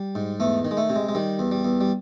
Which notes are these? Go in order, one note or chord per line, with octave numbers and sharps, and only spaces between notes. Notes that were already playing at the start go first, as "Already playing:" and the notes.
Already playing: G3
G#2
E2 A3
D#3
G#3
A3
C3
G#3
G#3
D#3 G3
E2
G3
E2
G3